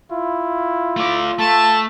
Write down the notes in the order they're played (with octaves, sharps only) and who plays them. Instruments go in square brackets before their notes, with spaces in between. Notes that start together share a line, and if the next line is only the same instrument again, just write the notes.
[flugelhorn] E4 [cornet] F4
[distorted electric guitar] A3 D5
[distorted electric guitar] A3 [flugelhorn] A4 [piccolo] A5